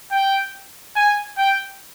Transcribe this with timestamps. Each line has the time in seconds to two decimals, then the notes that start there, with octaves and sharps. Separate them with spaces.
0.11 G5
0.96 G#5
1.37 G5